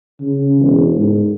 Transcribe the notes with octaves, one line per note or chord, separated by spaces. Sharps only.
C#3
E1
G#2